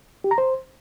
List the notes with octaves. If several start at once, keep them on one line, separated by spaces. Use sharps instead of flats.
G4
A#5
C5